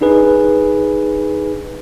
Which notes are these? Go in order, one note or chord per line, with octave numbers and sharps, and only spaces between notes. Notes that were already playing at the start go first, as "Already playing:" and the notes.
D4 D#4 G#4 B4